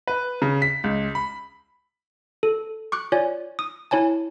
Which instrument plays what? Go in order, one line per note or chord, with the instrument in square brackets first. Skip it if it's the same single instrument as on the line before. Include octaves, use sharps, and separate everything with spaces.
[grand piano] B4
C#3
B6
C#2
B5
[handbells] A4
C#6 D6 F#6
F4 C#5 D5 G#5
D#6
E4 C#5 G#5 A5